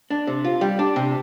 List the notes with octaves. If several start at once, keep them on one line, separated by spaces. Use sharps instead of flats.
D4
C3
F4
G3
D4
C3